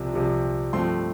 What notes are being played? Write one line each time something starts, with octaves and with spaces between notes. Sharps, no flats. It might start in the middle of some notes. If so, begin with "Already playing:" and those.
Already playing: C2 C3 F3
C2 C3 F3
G2 F3 A3 C4 C6